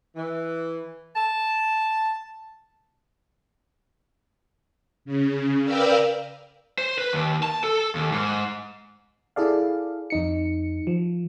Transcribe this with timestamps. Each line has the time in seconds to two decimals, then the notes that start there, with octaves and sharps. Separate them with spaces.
0.16 E3
1.16 A5
5.05 C#3
5.64 A#4 B4 D5 F5 G5 E6
6.78 C5
6.98 B4
7.13 D#2
7.43 A5
7.64 A4
7.95 D#2
8.12 G#2
9.36 E4 G#4 A4 D5 F5
10.10 F2 D#4 C#7
10.87 F3